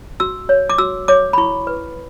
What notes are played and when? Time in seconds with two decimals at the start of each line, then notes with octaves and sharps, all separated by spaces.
0.20 F#4 E6
0.49 C#5
0.70 D6
0.78 F#4 E6
1.08 C#5 D6
1.33 B5
1.38 E4 C#6
1.67 B4